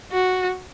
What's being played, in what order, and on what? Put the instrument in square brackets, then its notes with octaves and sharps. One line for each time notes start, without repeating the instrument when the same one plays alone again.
[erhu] F#4